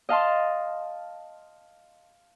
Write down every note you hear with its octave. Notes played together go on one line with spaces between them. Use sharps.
D#5 F5 A5 C6